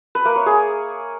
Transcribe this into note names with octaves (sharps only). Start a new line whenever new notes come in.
B4
A#3
C#5
G#4